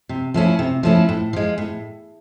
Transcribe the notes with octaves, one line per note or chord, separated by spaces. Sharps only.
C3
F3 A3 C#4 E4
C3
F3 A3 C#4 E4
A2
F3 G#3
A2